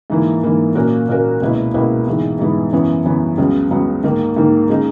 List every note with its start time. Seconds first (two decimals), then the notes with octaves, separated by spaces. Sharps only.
0.10 G#2 E3 A#3
0.43 G#2 E3 A#3
0.75 A#2 A#3 C#4 F#4 A#4
1.09 A#2 A#3 C#4 F#4 A#4
1.41 C#2 B2 A#3 E4 B4
1.74 C#2 B2 A#3 E4 B4
2.07 G#2 E3 G#3 B3 E4
2.39 G#2 E3 G#3 B3 E4
2.72 F#2 C#3 E3 B3
3.05 F#2 C#3 E3 B3
3.38 C#2 C#3 F#3 B3
3.70 C#2 C#3 F#3 B3
4.04 G#2 D#3 A#3
4.36 G#2 D#3 A#3
4.69 C#3 G#3 D#4